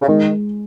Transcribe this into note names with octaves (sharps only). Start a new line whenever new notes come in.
C#3
D#3 G#3